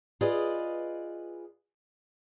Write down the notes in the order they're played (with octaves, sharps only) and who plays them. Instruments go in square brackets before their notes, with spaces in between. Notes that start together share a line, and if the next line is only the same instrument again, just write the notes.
[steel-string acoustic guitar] F4 G#4 B4 D5 D#5